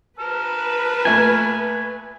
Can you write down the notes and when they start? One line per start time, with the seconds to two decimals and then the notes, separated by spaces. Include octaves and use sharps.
0.19 B4 A5 A#5 F6
1.05 A#2 A3 G#5